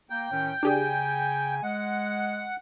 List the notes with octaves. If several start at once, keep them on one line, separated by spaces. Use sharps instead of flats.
A#3 G5
A2 D#3 C#4
C#3 D4 G4 G#4 G#5
G#3 F#5